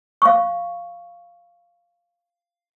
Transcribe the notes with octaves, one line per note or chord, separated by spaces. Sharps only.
F5 C#6